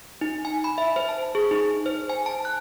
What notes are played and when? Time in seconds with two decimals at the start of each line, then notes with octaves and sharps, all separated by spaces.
0.21 D#4
0.45 G#5
0.64 B5
0.78 E5
0.96 C5
1.09 A5
1.35 G#4
1.51 D#4
1.86 C5
2.10 G#5
2.26 A5
2.45 F#6